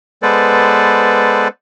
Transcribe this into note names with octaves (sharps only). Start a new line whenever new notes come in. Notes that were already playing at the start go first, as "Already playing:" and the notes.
G#3 B3 A4 B4 C5 D5